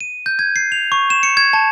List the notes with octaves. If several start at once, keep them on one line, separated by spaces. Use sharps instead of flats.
D#7
G6
G#6
C7
F7
C#6
E7
C#7
G#6
A5